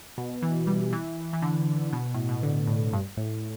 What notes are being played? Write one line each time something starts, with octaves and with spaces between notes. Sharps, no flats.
B2
E3
G3
E3
E3
D3
B2
A2
B2
D3
A2
G2
A2